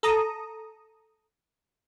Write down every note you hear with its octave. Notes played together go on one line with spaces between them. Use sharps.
A4 A#5 D#6